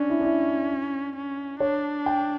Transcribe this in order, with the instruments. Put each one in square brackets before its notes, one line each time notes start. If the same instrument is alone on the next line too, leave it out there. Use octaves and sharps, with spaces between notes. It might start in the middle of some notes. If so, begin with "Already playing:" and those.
Already playing: [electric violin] C#4 [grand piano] D4
[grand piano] E4
D4
E4
[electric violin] C#4
[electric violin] D4 [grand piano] C#5
[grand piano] G5